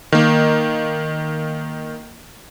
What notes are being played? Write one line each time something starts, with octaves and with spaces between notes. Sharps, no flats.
D#3 A#3